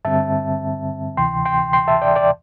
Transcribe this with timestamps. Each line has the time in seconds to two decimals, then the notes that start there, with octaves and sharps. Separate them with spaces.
0.05 G2 D3 G3 C4 E5 A5
1.17 D2 C3 E3 G5 C6
1.45 G5 C6
1.73 G5 C6
1.87 E5 A5
2.01 D5 G5
2.16 D5 G5